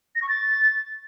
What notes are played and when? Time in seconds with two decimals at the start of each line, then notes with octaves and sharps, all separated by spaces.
0.15 A#6
0.22 C#6
0.29 A6